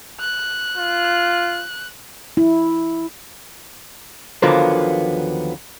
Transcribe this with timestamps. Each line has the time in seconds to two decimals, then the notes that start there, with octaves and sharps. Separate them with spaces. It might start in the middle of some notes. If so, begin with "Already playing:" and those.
0.20 F#6
0.78 F4
2.37 E4
4.42 D#2 D3 F3 F#3 A#3 B3